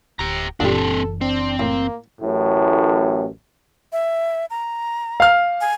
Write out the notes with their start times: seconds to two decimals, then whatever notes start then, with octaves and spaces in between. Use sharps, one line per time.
0.19 D1 G4 A#5
0.60 F#1 F#2 A#2 E3 G3 C4 D4 A4
1.21 C4 D4
1.60 A2 A#3
2.22 A1 F#2 A2
3.92 E5
4.50 A#5
5.20 F5 F6
5.61 G#5